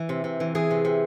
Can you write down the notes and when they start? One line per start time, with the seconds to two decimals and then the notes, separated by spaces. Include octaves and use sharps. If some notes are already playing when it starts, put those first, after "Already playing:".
Already playing: E3
0.09 C3
0.24 C3
0.40 E3
0.55 E3 G#4
0.71 C3
0.85 C3